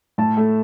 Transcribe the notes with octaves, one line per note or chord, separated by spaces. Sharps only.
A2 A5
A3